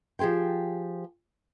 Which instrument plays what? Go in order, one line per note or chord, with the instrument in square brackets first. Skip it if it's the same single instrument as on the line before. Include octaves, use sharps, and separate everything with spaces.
[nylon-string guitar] F3 G4 G#4 C5 G5